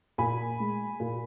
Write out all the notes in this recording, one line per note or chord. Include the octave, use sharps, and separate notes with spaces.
A#2 G#5 B5
G#3
A#2